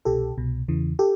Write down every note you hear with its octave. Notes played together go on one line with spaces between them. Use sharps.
C2 B2 G4 A4
C2 B2
E2 C#3 E3
G4 A4